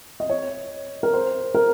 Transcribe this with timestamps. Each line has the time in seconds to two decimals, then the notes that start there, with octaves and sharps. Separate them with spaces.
0.20 D#5
0.30 C#5
1.03 A#4
1.13 C5
1.55 A#4